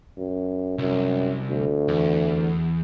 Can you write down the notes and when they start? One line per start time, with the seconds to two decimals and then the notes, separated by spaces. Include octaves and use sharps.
0.18 F#2
0.78 C2 F#2
1.49 D2
1.88 E2